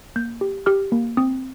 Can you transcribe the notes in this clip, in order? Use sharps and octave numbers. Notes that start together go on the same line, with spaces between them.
A#3 G6
G4
G4 F6
A#3
C4 D#6